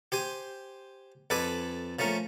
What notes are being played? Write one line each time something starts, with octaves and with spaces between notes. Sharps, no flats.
G4 C5 G#5
F2 A4 B4 G#5 B5 D6
F3 A3 C#4 A#4